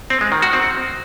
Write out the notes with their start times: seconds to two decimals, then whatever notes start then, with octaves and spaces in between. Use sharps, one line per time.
0.10 C4
0.21 G#3
0.32 D#3
0.42 F#4
0.53 C4